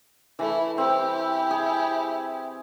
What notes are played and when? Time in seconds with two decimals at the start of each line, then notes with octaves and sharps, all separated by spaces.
0.39 E3 A3 E4
0.78 C4 E4 G4
1.51 G#4